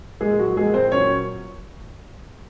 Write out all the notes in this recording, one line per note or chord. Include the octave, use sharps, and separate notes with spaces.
A#2 F3 G#3 A#3 G#4
F#3 F#4
A#2 F3 G#3 A#3 G#4
C4 C5
A#2 F#3 A#3 C#4 C#5